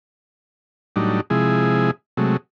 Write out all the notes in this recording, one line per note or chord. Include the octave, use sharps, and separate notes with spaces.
A2 F#3 G3 D4 D#4
C3 F3 G#3 E4 G#4
C3 F#3 G#3 A3